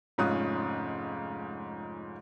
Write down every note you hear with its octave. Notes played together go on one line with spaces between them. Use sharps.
F1 G#2 C#4 F4 D#6 F#6